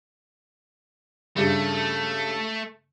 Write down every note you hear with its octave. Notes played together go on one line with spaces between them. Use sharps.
G2 C#3 G3 A3